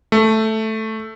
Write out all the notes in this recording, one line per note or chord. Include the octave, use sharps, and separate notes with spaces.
A3